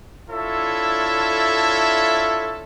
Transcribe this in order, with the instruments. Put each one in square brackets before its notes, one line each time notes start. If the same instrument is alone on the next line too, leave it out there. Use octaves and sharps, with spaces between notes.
[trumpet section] D4 E4 F4 A4 C#5 E5